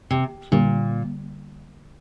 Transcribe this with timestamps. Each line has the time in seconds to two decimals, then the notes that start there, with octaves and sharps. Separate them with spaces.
0.11 C3
0.52 A#2 D3 G3 A#3